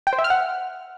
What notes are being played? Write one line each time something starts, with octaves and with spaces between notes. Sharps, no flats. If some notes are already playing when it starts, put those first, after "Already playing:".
G5
C5
E5
F6
F#5